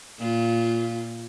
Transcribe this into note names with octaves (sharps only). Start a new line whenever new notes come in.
A#2 F4